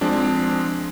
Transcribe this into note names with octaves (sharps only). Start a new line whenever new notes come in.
F3 G#3 C4 D4